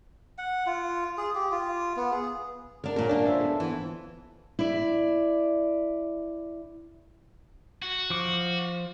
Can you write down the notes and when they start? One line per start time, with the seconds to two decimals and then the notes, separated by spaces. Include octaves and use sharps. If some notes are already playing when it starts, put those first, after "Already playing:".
0.38 F#5
0.67 F4
1.18 G#4
1.35 G4
1.52 F4
1.97 B3
2.12 G#4
2.84 D3 D4 A#4
2.96 A#2 C#4 A#4
3.09 A#3 D4
3.26 F4 C5 E5
3.41 B3 A4
3.60 E3
4.59 E4 D5
7.82 F#4
8.10 F3 D6